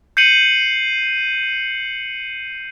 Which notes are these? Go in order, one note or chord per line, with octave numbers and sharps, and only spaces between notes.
G6 C7 C#7 D#7 F#7